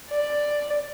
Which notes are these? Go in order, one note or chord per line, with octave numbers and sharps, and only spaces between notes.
D5